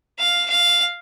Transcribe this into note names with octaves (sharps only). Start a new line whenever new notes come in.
F5
F5